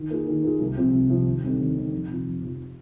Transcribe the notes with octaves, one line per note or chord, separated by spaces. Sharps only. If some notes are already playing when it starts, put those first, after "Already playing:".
Already playing: D#3
A#3 F4 G#4
D#3
A#3 F4 G#4
C2
C3 F3 C4
C2
C3 F3 C4
D#2
D3 G3 C4 D#4
D#2
D3 G3 C4 D#4
F2
C3 F3 C4 F4
F2
C3 F3 C4 F4